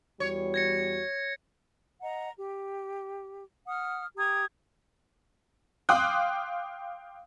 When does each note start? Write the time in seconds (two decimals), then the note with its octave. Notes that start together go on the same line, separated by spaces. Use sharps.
0.20 E2 G3 F#4 C#5
0.54 G#6 A#6 C#7
2.02 D#5 F#5 A#5
2.38 G4
3.67 F#5 D#6 F6
4.17 G4 A#5 D#6 G#6
5.89 F5 G5 C6 D6 D#6 F#6